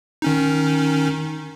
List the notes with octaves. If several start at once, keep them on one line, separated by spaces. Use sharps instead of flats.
D#3 C#4 D#4